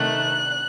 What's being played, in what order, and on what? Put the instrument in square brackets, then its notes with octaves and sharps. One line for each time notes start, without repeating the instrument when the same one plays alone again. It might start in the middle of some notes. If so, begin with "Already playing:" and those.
Already playing: [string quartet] C3 D#3 A3 F#6